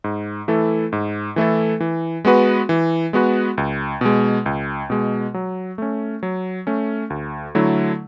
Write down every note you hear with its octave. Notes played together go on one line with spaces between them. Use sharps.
G#2
E3 A3 E4 A4
G#2
E3 A3 E4 A4
E3
G#3 B3 F#4 B4
E3
G#3 B3 F#4 B4
C#2
B2 G#3
C#2
B2 G#3
F#3
A3 C#4
F#3
A3 C#4
D2
D3 F#3 A3 E4